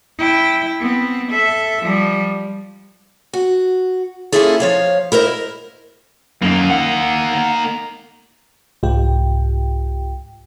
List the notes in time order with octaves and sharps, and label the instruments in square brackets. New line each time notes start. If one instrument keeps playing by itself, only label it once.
[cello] E4 G5
B3 C4
A4 E5
F3 G3
[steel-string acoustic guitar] F#4
A#3 C#4 E4 F4 G#4 A4
F3 C#5 F5
E4 A#4 C5 D#5
[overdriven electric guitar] F#2 [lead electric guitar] A#3 D#4
[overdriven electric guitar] F#5
[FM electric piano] C2 G#2 F4 G4 G5